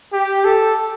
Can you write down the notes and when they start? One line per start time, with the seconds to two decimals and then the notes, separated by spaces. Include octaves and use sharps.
0.13 G4
0.45 A4